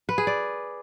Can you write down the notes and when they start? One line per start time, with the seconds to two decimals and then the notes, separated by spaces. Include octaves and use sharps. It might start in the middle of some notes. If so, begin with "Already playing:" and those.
0.09 B4
0.18 G#4
0.27 D5